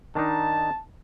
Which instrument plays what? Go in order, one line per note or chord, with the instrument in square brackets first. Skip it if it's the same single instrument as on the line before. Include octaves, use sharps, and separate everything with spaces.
[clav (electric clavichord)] D#3 D4 D#4 [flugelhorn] A5